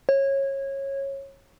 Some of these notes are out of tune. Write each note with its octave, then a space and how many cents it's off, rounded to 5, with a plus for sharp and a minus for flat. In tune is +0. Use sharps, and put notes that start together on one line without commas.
C#5 -20